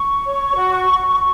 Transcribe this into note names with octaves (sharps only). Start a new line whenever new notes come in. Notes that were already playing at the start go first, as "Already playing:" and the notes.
Already playing: C#6
C#5
F#4